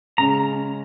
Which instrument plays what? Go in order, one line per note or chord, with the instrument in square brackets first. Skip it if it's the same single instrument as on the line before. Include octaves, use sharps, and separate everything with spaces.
[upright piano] C#3 G#3 C#4 [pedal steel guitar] A#5